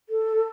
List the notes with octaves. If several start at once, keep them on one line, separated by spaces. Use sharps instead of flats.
A4